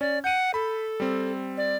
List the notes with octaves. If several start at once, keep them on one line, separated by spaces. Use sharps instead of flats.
C#4 D5
F#5 G6 D#7
A4 B5
G3 C4
D5